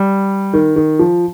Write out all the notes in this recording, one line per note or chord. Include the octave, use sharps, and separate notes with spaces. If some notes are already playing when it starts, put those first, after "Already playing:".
Already playing: G3
D#3
D#3
F3